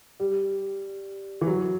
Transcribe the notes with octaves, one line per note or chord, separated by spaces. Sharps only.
G3
E3
F#3